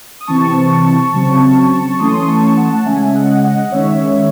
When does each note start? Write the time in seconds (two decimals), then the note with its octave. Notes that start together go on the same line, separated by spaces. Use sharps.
0.21 D#6
0.27 C3 E3 C4 A5 C#6
1.14 C#3 F#3 C4
1.99 E3 A3 C#4 C6 D#6
2.28 A5 C#6
2.57 F#5 A5
2.75 F#5
2.85 C#3 G#3 C#4 E5 G#5
3.15 D#5 F#5
3.43 D#5 F#5
3.72 D#3 G#3 C#4 C#5 E5